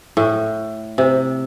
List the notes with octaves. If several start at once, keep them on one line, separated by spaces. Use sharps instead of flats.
A2
C3